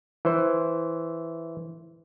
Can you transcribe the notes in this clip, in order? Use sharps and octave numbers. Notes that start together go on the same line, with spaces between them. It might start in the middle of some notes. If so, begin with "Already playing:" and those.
E3 C5